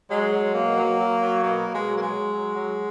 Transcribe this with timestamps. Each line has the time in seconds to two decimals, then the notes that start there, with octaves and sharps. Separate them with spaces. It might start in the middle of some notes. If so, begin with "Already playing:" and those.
0.10 F#3 G#3
0.32 F#3
0.54 B2 A#3
0.77 F#3
0.99 F#3
1.21 F#3
1.43 B2 A#3
1.66 B2
1.73 G#3
1.88 F#3
1.98 A#3
2.02 G#3
2.10 F#3
2.32 F#3
2.55 F#3